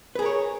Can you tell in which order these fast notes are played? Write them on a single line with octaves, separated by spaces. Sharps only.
B4 G#4 A#4 C#5